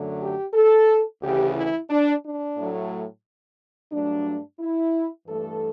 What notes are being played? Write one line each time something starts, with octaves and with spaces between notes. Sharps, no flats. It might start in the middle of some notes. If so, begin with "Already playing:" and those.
Already playing: F#2 D3 F#3 A3
G4
A4
D2 C#3 E3 G4
E4
D4
D4
A2 F#3 A3
G2 F#3 A3 D4
E4
G2 E3 A3 A4